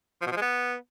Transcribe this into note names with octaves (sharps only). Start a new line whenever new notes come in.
F3
B2
F3
G#3
B3